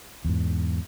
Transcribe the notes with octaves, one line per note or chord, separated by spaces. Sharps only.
E2 G#2